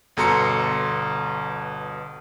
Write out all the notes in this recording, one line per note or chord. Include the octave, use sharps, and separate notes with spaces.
G1 B2 A4 A#5 C6 C#7